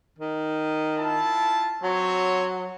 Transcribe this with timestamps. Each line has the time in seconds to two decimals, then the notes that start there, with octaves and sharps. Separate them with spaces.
0.19 D#3
0.98 E4 F4 A5
1.83 F#3 C4 F#4 C#5